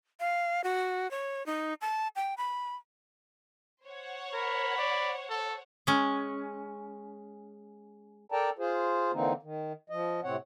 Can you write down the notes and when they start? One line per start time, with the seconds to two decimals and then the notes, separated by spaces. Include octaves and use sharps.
0.20 F5
0.64 F#4
1.11 C#5
1.46 D#4
1.81 A5
2.16 G5
2.38 B5
3.85 C5 C#5 F#5
4.33 A#4 B5
4.79 D5
5.30 A4
5.87 G#3 C#4
8.32 A4 A#4 D5 G5 A5 A#5
8.59 F4 G#4 C5
9.13 D3 E3 A#3 C4 D#4
9.43 D#3
9.90 F3 D#5
10.24 A2 C3 C4 C#5 F#5